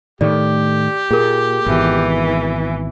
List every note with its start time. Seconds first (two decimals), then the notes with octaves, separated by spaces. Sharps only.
0.21 A2 D#3 A3 G4 D5
1.11 A#2 G#4 A#4
1.66 G#1 B2 E3